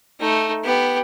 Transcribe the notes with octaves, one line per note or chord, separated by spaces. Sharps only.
A3 D#4
B3 G4